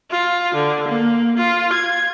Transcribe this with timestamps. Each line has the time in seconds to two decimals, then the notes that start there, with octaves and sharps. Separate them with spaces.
0.10 F4
0.55 D3
0.88 A#3
1.37 F4
1.73 G#6